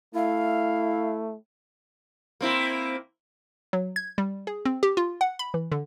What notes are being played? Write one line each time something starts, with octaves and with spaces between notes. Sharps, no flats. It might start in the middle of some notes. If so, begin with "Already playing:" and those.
A3 E4 F5
A#3 C4 E4
F#3
G#6
G3
G#4
C4
G4
F4
F#5
B5
E3
D3